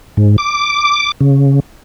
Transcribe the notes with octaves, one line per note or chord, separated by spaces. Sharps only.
G#2
D6
C#3